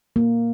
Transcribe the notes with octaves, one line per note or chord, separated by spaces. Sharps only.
A#3